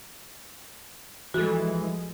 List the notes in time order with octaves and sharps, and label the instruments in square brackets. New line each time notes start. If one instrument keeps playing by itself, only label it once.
[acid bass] E3 [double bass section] F3 G#3 [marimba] F#4 A4